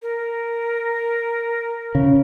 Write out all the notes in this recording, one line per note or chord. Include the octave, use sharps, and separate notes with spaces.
A#4
C#3